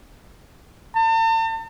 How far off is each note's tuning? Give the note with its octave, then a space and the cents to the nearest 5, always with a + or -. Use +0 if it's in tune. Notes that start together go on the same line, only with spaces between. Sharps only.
A5 +40